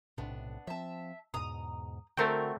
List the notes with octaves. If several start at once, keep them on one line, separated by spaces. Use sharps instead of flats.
B1 A2 C3 B3 D4
F3 C4 E5 A5
E2 G#2 B2 A#5 D#6
D3 A3 C4 F#4 A#4 G5